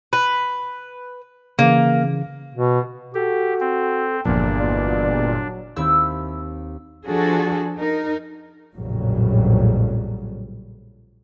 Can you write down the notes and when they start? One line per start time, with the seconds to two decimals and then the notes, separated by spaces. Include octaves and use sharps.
0.13 B4
1.59 C#3 E3 A#3
2.54 B2
3.15 F#4 G4 A4
3.60 C4
4.25 G1 E2 A#2 F3 D4
4.60 B2 D5
5.29 F#3
5.76 D#2 C4 E4 E6 G6
7.07 F3 D4 F#4 G#4 A4
7.78 D#4 A#4
8.75 A#1 F2 A2 C#3 F#3 G3